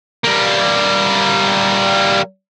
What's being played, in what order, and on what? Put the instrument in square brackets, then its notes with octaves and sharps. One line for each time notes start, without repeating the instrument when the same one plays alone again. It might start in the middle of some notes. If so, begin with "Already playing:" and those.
[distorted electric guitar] G3 A#3